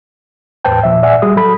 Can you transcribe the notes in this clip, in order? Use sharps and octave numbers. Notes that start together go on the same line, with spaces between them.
E2 A2 B4 C5 G5 A5
A#2 F3 E5
D5 E5 F#5 G#5
G3 F#4 G#4 D#6
F#3 A4 B5